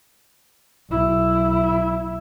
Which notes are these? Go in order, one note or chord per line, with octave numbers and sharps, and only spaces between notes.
B1 E4